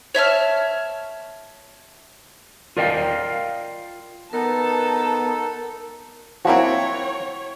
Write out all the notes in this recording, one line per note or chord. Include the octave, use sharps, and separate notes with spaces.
C#5 E5 A5 F6
F4 A#4 D5 D#5 F5 G5
B3 D#4 A4 A#4 A5
F3 A#3 C4 E4 F#4 C#5